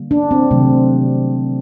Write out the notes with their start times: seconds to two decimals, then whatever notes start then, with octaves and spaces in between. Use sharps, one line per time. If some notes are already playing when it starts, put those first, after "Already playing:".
Already playing: D3 G3 A#3
0.11 D4
0.31 C4
0.51 C3 D#3 F#3 A3